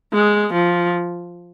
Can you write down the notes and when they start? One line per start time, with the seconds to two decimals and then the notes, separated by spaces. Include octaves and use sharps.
0.13 G#3
0.53 F3